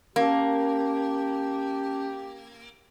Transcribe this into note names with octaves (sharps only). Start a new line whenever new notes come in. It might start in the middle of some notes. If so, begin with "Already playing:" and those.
A#3 C#4 G4 A5